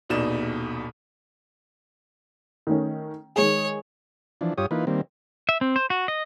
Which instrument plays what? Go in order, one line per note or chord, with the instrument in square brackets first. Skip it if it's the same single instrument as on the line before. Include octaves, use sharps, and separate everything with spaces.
[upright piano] D#1 A#1 B2 D#4 D5 E7
[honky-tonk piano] D#3 A3 C#4
[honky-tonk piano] D#3 G#3 G#4 [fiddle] C#5
[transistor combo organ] E3 F3 D4
G2 F4 G4 C#5 D#6
E3 A#3 D#4 F4 B4
D#3 G3 A#3 C4
[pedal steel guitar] E5
C4
C5
F#4
D#5